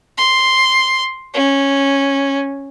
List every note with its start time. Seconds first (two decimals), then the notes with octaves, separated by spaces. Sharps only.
0.18 C6
1.34 C#4